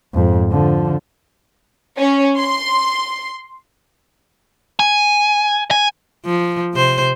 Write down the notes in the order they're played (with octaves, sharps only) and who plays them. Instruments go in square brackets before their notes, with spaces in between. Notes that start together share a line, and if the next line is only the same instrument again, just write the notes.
[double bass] F2 G#2
D3 F3
[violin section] C#4
C6
[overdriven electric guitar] G#5
G#5
[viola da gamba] F3
C3 C5